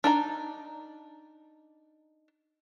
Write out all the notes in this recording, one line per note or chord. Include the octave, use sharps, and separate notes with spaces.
D4 D#4 A#5